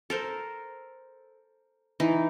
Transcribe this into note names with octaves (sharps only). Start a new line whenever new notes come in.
A4 A#4 C5
E3 D#4